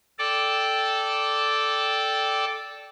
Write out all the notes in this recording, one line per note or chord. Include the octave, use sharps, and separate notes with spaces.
A4 D5 G5 A5 D6